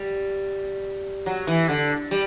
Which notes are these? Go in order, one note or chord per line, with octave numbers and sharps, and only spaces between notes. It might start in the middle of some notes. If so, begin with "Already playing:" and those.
Already playing: G3
F#3
E3
D3
G3